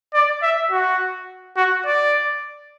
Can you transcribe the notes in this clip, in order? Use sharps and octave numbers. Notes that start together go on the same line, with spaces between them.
D5
E5
F#4
F#4
D5